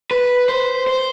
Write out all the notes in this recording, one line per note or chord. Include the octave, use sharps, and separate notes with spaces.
B4
C5
C5